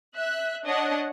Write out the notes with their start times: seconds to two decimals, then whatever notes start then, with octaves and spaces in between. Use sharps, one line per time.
0.15 E5 F#6
0.66 D4 C#5 D#5 F#5